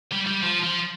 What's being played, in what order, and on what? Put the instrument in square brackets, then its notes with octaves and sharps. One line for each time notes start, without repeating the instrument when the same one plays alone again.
[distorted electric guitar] G3
G3
F3
F3